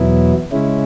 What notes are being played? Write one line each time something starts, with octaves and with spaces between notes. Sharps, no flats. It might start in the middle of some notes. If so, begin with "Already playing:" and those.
Already playing: E2 B2 F#3 B3 E4
C#3 G#3 C#4 E4